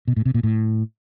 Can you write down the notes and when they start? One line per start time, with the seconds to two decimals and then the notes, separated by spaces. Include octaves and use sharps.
0.08 B2
0.16 A2
0.25 C3
0.34 A#2
0.43 A2